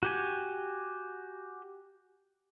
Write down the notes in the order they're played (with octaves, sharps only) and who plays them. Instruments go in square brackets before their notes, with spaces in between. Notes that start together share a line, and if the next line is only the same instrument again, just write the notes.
[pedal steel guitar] F#4 G4 G#5